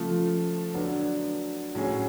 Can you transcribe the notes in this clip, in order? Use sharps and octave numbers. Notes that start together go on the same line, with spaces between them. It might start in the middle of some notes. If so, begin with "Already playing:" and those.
Already playing: C#3 F3 A3 F4
D3 F#3 B3 D4
A2 F#3 C#4 G#4